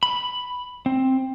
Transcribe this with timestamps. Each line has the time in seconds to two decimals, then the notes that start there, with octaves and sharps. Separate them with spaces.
0.03 B5
0.86 C4